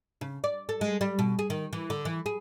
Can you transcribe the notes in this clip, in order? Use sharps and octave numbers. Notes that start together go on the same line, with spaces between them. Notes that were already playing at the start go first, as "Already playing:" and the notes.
C#3
D5
A4
G#3
G3
B2
G#4
D#3
E3
D3
E3
G#4